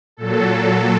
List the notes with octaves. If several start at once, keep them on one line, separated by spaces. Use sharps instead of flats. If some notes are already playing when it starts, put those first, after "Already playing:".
A#2 F#3 A4
A#2 F#3